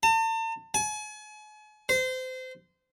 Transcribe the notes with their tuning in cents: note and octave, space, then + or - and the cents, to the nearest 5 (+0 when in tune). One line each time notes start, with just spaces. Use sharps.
A5 +40
G#5 +40
C5 -25